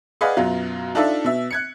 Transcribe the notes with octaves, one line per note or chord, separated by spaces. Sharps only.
G#4 B4 D5 D#5 F5 F#5
F#2 B2 F#3 F4
D4 D#4 F4 A4 D5 E5
B2 E5
F#6 G#6 C#7